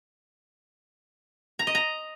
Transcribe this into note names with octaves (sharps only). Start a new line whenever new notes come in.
A#5
D#5
A#5